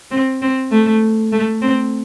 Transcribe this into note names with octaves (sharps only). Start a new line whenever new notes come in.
C4
C4
A3
A3
C4